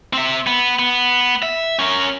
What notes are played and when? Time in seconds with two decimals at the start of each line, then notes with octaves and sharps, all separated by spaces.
0.13 C4 E5
0.47 B3
0.79 B3
1.43 E5
1.79 C#4 A#4